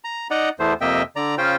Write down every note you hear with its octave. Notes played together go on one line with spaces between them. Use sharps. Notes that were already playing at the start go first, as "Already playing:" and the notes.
A#5
D#4 D5 D#5 F#5 A#5
E2 E3 A3 B3 C5
F2 C3 A#3 D#5 E5 G5
D3 D5 A#5
C#3 C#4 F4 C5 G5